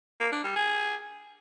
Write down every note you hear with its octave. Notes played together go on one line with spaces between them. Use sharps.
A#3
D4
G3
G#4